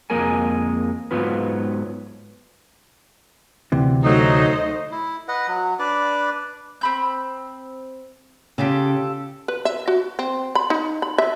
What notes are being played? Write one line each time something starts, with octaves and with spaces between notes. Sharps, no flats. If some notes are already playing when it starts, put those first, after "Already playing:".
F2 G#3 A#3 G#4 A#4 G#5
G#2 F#3 B3 F4 B4
D2 C3 E3
F#3 A3 D#4 C5 D#5
E4
B4 D#5 F#5
F#3
D4 B4 D5
C4 B5 G6
C#3 F4 G4 A4
B4
E5
F#4
C4
B5
D#4
B5
E5